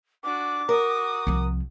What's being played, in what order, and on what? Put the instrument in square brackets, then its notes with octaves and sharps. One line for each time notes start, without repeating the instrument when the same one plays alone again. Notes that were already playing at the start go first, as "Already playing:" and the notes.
[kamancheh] D4 F#4 [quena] D6
[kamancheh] F#4 D#6 [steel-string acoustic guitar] A#4
[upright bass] C2 F3